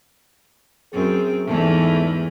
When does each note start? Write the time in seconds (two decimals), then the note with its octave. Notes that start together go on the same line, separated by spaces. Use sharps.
0.93 F#2 C4 G#4
1.46 E2 G#2 E3 A3